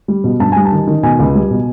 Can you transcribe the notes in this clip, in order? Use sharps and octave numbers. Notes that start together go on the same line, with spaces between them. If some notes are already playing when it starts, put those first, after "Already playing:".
G3
B2
G2 A5
G3 G#5
A5
D#3
D#3
B2 G#5
C#2
G3
B2